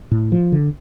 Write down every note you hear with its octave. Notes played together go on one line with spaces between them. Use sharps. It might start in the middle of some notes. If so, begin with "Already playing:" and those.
A2
F3
D3